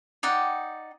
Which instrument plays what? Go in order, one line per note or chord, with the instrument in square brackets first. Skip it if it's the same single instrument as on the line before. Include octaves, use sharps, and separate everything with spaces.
[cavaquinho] D#4 D5 F#5 G5